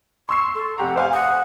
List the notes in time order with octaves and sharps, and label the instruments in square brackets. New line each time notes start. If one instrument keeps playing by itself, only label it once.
[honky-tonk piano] C6 E6 C7 [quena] C#6
[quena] A4
[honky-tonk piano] F1 G4 A#5 [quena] F#5
[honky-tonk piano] C5 F5 G#5
[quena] F#5 [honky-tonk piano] D#6